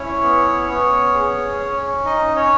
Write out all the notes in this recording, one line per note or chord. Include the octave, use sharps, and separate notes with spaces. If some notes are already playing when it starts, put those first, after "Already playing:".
Already playing: C#4 E4 C#5
B3
B3
G#4
C#4
D#4 D#5
C#4 C#5